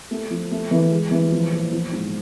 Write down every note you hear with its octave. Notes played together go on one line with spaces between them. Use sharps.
A3
F3
A3
E3
G#3
E3
F3
A#2
F3
G#2